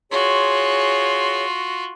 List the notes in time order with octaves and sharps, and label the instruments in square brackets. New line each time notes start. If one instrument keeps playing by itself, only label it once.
[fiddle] F4 F#4 [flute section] G#4 C#5 C6